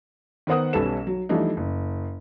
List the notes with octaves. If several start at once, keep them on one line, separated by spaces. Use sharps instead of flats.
D#3 B3 A#4 C5 F#5 D#6
B1 G3 C#4 A4 B4 E7
F#3
E3 F3 G3 A3 D4 D#4
F#1